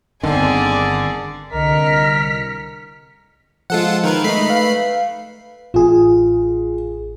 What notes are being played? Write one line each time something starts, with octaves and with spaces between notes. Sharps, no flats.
G1 D3 D#3 C4 G#4 D5
C2 D3 A#4 D#5 F6 B6 C#7
F3 G#3 F4 A4 F#5
D#3 A#4 B4
G#3 A3 D#4 D#5 B5 C7
B4 F5
A1 F4 G#4